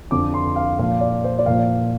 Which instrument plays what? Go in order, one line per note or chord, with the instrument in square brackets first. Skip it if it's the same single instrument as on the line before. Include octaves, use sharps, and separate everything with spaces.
[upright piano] F2 D3 F3 D6
C6
F5
A#2 F3 F5
D5
C5
D5
A#2 F3 F5